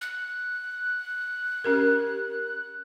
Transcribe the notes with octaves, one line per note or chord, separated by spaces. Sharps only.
F#6
C#4 G4 A#4